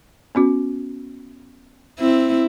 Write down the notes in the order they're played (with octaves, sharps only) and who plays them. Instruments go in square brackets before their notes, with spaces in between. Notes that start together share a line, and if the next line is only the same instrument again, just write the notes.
[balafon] B3 C#4 F#4
[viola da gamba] C4 E4